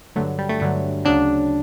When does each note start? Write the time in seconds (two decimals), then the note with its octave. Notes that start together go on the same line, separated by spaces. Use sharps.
0.16 G2 D3 F#3 A3
0.38 G3
0.49 A3
0.60 G2 D3 F#3 A3
1.05 D2 C#3 F#3 D4